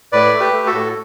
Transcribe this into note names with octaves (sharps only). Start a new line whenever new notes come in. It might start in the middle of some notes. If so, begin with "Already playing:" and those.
A2 B4 D5
A3
G4 B4
A3
F#4 A4
A2